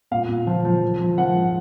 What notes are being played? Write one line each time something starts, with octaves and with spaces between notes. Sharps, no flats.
A#2 F5
A#2
F3
F3
F3
F3
F3 F#5
G#2